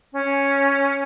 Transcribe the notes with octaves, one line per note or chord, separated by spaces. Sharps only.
C#4